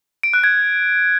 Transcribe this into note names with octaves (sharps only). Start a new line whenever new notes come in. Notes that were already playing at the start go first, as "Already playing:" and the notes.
D7
F#6
G#6